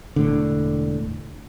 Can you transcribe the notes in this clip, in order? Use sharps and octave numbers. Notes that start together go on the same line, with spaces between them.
E1 A2 D3